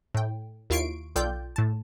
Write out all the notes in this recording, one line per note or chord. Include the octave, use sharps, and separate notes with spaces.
A2 G5
D#2 E4 F4 C#6 C7 D7
B1 F4 A4 D5 G5 G6
A2 A5